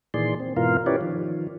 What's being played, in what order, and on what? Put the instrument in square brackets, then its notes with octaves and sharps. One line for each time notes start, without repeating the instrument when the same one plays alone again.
[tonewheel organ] A#2 D#3 E3 G#4 D5 C6
C4
G#2 B2 E3 F4 A#4 F5
C#4 E4 G4 B4 C#5 D5
D#3 F3